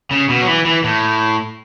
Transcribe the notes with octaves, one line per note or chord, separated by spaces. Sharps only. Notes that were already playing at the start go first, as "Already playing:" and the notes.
C#3
B2
F#3
E3
E3
A2